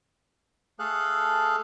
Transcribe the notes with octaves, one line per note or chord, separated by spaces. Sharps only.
A3 G#4 A4 F5 F#6